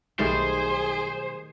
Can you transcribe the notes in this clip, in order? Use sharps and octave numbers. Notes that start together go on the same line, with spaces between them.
B1 D#3 G3 A3 G#4 C5